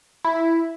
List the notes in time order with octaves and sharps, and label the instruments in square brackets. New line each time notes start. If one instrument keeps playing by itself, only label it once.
[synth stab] E4